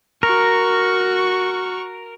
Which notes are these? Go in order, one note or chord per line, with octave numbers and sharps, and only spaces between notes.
F#4 A#4 C#6